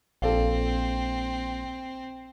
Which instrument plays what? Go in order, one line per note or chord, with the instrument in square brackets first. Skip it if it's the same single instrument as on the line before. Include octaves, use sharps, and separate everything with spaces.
[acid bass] A#1 [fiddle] C4 [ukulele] A4 D5 F5